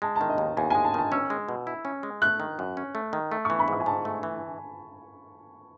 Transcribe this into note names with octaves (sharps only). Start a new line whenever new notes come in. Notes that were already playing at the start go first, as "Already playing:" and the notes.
G#3 A5
A5
D#3
D#5
D#2
D#2 G#5
G#3 G#5
A5
D#3 A5
C#4 E6
G#3
B2
E4
C#4
G#3
A3 F#6
D#3
F#2
C#4
A3
D#3
A3
E3 C#6
B5
G#2 C#6
G#5
G#2 A5
A3
E3